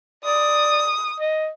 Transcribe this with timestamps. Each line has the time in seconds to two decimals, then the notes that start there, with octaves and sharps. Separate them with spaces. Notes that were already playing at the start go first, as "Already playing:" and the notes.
0.24 D5 D#6
1.20 D#5